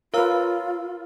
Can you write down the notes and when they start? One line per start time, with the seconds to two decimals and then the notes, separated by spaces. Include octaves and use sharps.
0.14 F4 A#4 B4 C#5 F5 E6